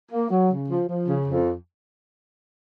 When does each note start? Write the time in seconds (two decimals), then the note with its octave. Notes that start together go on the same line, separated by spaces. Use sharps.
0.12 A#3
0.30 F#3
0.50 C#3
0.69 F3
0.89 F3
1.08 C#3
1.27 F2